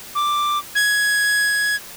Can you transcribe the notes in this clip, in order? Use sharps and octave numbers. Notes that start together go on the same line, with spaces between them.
D6
G#6